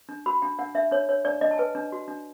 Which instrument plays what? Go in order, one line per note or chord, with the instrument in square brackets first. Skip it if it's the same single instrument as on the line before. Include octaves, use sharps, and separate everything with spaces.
[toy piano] D4
F#4 B5
D4 G5
D4 F#5
D4 E5
D4 C#5
D4 C#5
D4 D5
D4 D#5
A5
B4 G#5
D4
F#4
D4